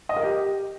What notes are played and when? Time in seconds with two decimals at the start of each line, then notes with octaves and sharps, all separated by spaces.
0.09 D#5
0.16 A#4
0.24 G4